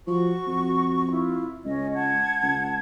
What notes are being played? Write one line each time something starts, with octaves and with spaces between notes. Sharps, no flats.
F3 F#4 C#6
F2
E4 F4
C#2 C#4 D#5
F#5 A5 G#6
C#2